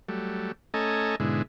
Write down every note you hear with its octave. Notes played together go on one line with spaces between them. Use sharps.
F#3 G3 A3
A3 C#4 A4 D#5 G#5 A#5
G#2 B2 D3 G#3 E4